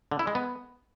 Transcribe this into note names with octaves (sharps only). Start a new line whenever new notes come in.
D3
E4
G#3
B3